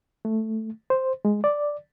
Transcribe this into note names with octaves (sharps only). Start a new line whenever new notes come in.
A3
C5
G#3
D5